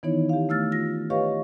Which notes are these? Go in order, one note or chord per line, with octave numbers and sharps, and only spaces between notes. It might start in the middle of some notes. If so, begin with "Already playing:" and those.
D#3 E3 B3 D#4 E4 C#5
G4 F5
A3 E6 F6 A6
F4 A#6
G4 B4 C#5 D#5 F5 C#6